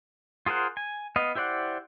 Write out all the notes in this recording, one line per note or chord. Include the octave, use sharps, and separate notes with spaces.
F4 G#4 A#4 C5 F#5
G#5
B3 D#5 F5
E4 G4 C5 D5 F#5